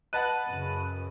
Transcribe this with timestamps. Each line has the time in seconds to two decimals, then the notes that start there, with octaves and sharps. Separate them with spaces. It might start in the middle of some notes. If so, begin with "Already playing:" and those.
0.13 B4 D#5 F#5 A5 F#6 D#7
0.47 F#2 C#3